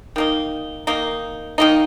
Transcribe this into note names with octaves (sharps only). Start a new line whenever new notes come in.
D#3 A#3 D#4
D#3 A#3 D#4
D#3 A#3 D#4